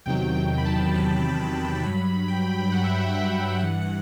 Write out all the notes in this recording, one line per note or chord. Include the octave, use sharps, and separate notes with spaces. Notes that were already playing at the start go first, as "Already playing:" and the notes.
E2 C3 D#3 F#3 G5
G5
B5
A5
E2 C3 D#3 F#3 B5
G2 F#3 B5
G5
G2 F#3 F#5
E5
F#5
G5
G2 E3 F#5
F#5